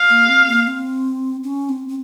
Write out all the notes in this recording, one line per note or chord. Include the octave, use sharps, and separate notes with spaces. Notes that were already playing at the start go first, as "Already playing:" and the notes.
Already playing: F5
A#3
C4
A#3
C4
C#4
C4
C4